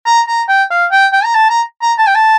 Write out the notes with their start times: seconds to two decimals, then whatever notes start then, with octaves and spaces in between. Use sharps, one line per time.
0.06 A#5
0.28 A#5
0.48 G5
0.71 F5
0.92 G5
1.13 G5
1.24 A#5
1.34 A5
1.50 A#5
1.82 A#5
1.98 A5
2.07 G5
2.15 A5